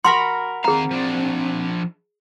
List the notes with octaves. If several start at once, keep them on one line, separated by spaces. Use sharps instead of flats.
F#4 A#4 B5 C6
D#3 C4 G#4 F5 A#5
F3 D4